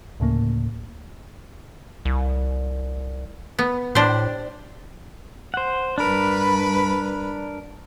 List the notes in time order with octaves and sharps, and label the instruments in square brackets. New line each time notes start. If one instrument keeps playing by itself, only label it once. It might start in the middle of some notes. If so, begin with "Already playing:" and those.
[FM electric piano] D2 A2 C#3 A#3
[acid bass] C2
[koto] B3
[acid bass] A2 [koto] D4 G4 C5
[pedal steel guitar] C5 F#5
[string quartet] G2 B4 B5 [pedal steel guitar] D4 A#4